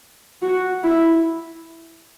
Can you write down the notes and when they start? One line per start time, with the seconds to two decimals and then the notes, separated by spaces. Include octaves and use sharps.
0.42 F#4
0.83 E4